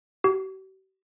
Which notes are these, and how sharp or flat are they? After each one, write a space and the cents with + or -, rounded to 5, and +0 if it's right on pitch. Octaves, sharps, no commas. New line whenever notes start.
G4 -45